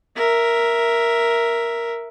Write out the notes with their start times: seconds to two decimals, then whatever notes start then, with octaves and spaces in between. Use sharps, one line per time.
0.16 A#4 E5